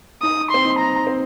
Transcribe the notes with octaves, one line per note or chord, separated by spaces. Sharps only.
D#4 D#6
C4 C6
D#4
A#5
C4